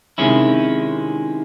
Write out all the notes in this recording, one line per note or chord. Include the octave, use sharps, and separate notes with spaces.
C3 D#3 G#3 C#4 E4